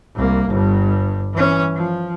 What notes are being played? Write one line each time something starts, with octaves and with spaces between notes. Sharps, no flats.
C2 A#3
G1 G2
E3 C#4
F3